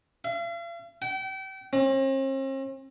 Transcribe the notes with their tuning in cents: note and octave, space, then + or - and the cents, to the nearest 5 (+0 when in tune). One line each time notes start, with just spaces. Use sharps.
F5 -45
G5 -35
C4 +45